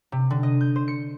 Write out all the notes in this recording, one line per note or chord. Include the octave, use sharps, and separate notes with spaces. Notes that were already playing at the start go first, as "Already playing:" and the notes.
C3
D3
D#5
G6
C5
C#7